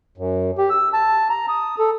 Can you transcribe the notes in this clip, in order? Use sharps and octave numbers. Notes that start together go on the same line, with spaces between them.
F#2
G4
E6
A5
A#5
D#6
A4